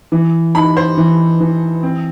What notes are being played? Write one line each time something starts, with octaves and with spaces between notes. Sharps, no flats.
E3
D#4 B5
C5
E3
E3
C4